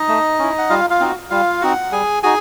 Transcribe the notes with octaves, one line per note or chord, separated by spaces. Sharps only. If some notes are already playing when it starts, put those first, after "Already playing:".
Already playing: D#4 D#5
A3
C#4 E4
F#5
G3 F4 F5
F4 F5
C4 D#4 F#4
G3 F4 F5
C4 D#4 F#4 F#5
G3 G#4 G#5
D#4 F#4 G#4 G#5